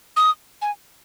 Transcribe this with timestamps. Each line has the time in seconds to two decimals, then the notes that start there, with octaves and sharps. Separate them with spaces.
0.16 D#6
0.62 G#5